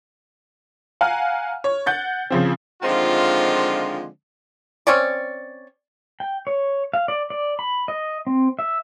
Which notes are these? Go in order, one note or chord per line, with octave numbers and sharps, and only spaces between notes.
F5 F#5 G#5 A#5 F6
C#5
F#5 G6 A6
C#3 F3 C4
D3 D#3 F3 G#3 C4 F4
C4 C#4 C#5 D5
G5
C#5
F5
D5
D5
B5
D#5
C4
E5